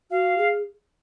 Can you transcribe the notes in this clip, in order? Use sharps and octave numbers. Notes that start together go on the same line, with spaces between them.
F#4 F5
G#4